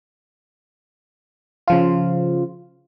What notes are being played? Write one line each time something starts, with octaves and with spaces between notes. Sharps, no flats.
C#3 F3 F4